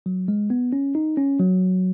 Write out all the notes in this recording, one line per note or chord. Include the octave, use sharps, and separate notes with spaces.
F#3
G#3
B3
C#4
D#4
C#4
F#3